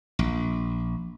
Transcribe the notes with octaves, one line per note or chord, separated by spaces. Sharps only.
A#1